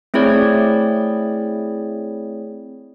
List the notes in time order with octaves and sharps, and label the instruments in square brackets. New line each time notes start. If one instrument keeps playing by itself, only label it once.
[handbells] A3 C4 E4 G#4 C#5 D5